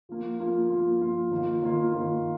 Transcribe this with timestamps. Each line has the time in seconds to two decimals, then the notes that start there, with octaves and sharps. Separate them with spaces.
0.09 F3 A#3 F4
0.40 F3 A#3 F4
0.70 F3 A#3 F4
1.01 F3 A#3 F4
1.31 D#3 A#3 F4
1.62 D#3 A#3 F4
1.92 D#3 A#3 F4